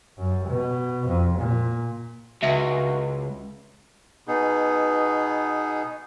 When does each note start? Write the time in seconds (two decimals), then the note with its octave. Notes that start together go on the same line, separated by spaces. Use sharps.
0.17 F#2
0.47 B2
1.07 F2
1.38 A#2
2.43 C#2 F#4 E5
4.28 B2 B3 D#4 G#4